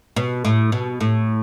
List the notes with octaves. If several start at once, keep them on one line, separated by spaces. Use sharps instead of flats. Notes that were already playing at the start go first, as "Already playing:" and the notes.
B2
A2
B2
A2